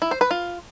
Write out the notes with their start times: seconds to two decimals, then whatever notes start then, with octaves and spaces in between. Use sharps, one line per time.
0.02 E4
0.11 C5
0.21 B4
0.31 F4